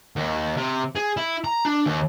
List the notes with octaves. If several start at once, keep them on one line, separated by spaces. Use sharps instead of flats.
D#2
C3
G#4
E4
A#5
D4
D#2